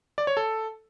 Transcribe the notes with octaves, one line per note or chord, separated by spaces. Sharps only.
D5
C#5
A4